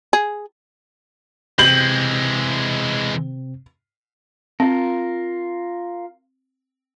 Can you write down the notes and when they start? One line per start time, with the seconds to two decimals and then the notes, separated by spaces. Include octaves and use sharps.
0.13 G#4
1.59 C3 E3 G#3 C4 G6 F#7
4.60 C4 F4 A#4